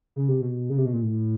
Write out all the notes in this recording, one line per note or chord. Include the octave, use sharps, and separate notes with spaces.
C#3
C3
B2
C#3
C3
B2
A#2
A2